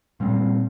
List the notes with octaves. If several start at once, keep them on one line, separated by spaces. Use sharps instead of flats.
A#2 G3 C4